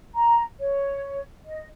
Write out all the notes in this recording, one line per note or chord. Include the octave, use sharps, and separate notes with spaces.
A#5
C#5
D#5